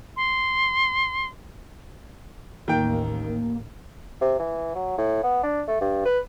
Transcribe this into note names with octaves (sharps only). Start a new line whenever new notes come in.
C6
A1 D#2 D#3 A#3 G5
C3
E3
F#3
A2
B3
D4
A3
G2
B4